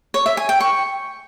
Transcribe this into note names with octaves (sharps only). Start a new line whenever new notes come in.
C#5
E5
G#5
G5
C#6